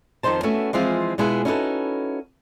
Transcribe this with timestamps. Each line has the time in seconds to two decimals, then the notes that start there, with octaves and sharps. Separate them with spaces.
0.23 F2 D#3 F3 D#4 C5 A5
0.43 A3 B3 C#4 E4 F#4
0.73 E3 F3 G#3 C4 F4
1.18 B2 G#3 B3 E4 F4 G#4
1.45 C#4 D#4 E4 F#4 A4 B4